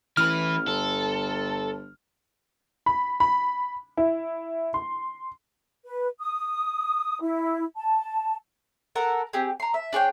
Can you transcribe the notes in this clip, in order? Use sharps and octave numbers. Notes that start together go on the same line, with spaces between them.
A1 E3 B4 F6
G1 A4
B5
B5
E4
C6
B4
D#6
E4
A5
A4 A#4 F#5
C4 G4 G#4
A#5 C6
E5
D4 G#4 C#5 G5